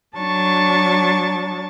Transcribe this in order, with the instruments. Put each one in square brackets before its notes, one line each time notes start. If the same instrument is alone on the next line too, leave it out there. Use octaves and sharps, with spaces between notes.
[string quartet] F#3 D4 A5 C#6 A6